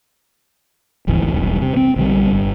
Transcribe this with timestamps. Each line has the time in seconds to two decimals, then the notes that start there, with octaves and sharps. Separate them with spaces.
1.07 D#1 G#1 D2 E3
1.32 E1 B1 G2
1.61 C3
1.77 C4
1.96 A#1 D3 F#3 G3
2.31 G1